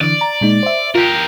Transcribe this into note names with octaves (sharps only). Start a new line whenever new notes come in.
D3 E3 D5
A#5
A#2 G#3 D#4
C5 E5
F4 G4 A#4